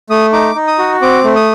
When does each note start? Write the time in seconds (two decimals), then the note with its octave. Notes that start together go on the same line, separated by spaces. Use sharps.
0.10 A3 D#6
0.32 D#4 D6
0.55 D#4
0.68 D#6
0.79 F#4
1.02 C4 D6
1.24 A3
1.36 D#6